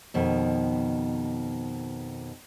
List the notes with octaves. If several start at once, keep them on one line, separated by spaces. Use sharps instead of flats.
F2 B2 D#3